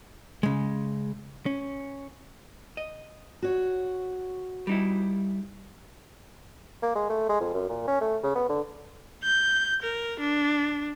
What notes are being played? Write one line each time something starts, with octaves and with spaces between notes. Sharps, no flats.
C#3 G#3
C#4
D#5
F#4 C#5
G3 D#4 E4
A#3
G#3
A3
G#3
F2
F#2
A#2
C#4
A3
C#3
B3
D3
G6
A#4
D4